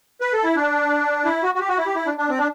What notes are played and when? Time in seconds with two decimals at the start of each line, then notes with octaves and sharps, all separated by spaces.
0.21 B4
0.33 A4
0.44 E4
0.56 D4
1.25 E4
1.43 F#4
1.55 F#4
1.60 G4
1.69 F#4
1.77 E4
1.86 G4
1.95 E4
2.06 D4
2.18 D4
2.30 C4
2.38 D4